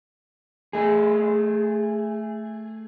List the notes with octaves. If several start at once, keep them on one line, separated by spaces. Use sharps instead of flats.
A3 G#4